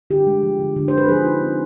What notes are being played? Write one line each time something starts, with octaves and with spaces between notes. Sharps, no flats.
D3 G4
G#3
F3
D3
D3
G#3 C5
B4
F3 G#4
D#4
C4